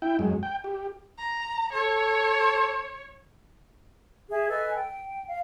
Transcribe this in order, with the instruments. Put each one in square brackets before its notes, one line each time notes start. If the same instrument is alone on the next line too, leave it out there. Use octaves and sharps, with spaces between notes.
[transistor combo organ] E4 G5
F#2 G#3
G5
G4
[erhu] A#5
[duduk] A4 [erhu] C#5
[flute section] G#4 E5
A4 B4 D#5 G#5
G5
F5